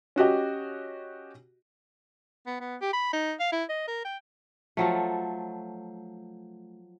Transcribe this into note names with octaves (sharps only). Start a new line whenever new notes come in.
C#4 F#4 G4 D#5
B3
B3
G4
B5
D#4
F5
E4
D#5
A#4
G5
F3 F#3 A3